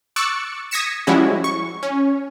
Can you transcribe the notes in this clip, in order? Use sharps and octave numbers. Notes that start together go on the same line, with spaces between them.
C#6 D6 E6 F#6 A6 C#7
D#6 G#6 A#6 B6 C#7 E7
F3 G3 G#3 C#4 E4 F#4
C#6
C#4